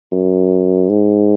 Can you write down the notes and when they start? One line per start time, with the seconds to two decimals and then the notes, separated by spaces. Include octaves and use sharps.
0.12 F#2
0.89 G#2